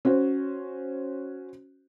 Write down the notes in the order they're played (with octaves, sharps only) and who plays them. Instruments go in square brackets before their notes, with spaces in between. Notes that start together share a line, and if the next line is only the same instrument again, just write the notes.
[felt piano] C#4 F#4 C5